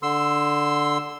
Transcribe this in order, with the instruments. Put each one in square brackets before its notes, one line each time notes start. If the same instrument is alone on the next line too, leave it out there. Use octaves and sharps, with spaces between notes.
[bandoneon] D3 C6 E6